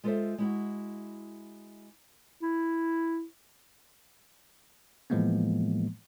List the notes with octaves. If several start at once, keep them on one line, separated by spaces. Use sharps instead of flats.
G#3 F4 A4 B4 C5 E5
G#3 E4 F#4
E4
A2 E3 F3 G#3 A#3 B3